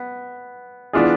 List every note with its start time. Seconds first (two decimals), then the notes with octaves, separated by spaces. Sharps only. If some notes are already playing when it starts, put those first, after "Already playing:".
Already playing: B3
0.93 E3 B3 D4 F4 G#4